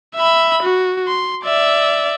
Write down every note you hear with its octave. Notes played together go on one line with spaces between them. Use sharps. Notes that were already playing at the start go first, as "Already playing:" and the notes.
E5 B5
F#4
C6
D5 E5